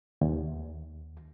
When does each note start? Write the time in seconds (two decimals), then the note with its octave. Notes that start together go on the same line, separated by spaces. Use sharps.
0.21 D#2